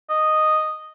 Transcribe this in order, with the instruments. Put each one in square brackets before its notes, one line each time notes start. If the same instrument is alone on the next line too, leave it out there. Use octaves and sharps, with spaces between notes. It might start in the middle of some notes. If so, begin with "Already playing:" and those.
[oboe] D#5